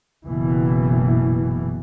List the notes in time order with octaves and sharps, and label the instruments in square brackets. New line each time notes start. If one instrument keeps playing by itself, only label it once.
[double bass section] F#1 B2 E3